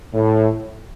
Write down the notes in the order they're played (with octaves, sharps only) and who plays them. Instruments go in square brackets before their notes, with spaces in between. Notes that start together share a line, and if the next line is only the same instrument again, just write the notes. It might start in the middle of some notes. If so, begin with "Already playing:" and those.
[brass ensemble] A2